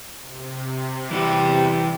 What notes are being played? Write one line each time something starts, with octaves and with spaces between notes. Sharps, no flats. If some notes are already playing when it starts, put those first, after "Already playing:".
C3
E3 G3 E4 F#5